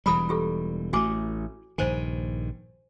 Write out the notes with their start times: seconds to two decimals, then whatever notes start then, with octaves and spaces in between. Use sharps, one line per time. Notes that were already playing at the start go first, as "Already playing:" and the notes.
0.06 E1 E3 G3 A#5 B5 D#6
0.29 F4 G4 A4
0.93 A1 A3 F#4 G#5 D6
1.78 A#1 G2 D#3 C5 G#5